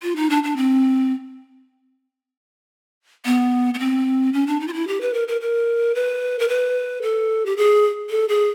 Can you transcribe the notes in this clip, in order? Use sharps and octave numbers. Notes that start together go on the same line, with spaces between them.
F4
D#4
D4
D4
C4
B3
B3
C4
C#4
D4
D#4
F4
E4
G4
B4
A#4
A#4
A#4
B4
A#4
B4
A4
G4
G#4
A4
G#4